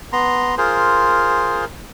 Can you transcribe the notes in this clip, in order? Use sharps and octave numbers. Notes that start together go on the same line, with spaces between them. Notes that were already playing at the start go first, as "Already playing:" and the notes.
B3 A#5 C6
F4 G#4 A#4 C5